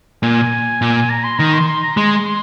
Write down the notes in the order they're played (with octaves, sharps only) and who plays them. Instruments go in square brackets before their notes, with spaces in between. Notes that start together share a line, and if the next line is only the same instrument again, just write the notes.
[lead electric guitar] A#2 [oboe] G#5
[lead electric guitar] A#2
[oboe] A#5
C6
[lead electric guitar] D#3 [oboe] A#5
[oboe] C6
C6
A#5
[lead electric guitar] G#3 [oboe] C6
[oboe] C6